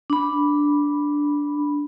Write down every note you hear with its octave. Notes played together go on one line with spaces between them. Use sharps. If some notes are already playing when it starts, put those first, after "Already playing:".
D4 B5